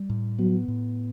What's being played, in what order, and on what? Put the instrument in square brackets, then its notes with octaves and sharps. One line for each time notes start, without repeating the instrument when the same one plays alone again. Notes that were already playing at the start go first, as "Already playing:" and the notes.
Already playing: [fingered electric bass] G3
A2
[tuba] F#3 [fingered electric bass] B3
[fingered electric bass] A2